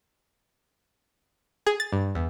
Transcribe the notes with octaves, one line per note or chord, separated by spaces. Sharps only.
G#4
A6
G2
E2